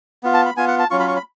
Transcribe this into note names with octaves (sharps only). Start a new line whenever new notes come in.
B3 F4
A5
B5
B3 F4 G#5
F#5
A5
F#3 C#4 F4 C#6
B5
C#6
B5